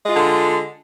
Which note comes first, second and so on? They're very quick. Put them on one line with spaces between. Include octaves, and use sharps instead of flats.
G#3 F4 D3